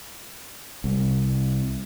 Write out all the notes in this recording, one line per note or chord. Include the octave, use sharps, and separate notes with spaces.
C2